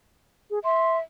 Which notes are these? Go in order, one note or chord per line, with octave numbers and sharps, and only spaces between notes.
G#4
E5 C6